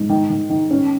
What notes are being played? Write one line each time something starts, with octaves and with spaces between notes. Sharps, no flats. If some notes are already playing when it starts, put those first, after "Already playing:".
Already playing: G#2
D#3
D#3
D#3
C#4